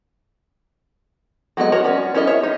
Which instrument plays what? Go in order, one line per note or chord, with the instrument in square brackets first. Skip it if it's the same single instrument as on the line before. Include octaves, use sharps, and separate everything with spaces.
[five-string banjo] F#3 G#3 B3 A#4 D#5
F#4 A#4 C#5
C#4 D5
C#4 E4 A#4 D#5
C#5 E5
D#4